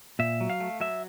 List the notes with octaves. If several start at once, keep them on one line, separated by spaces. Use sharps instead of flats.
A#2 E5
F#3
F5
A3
F#3 E5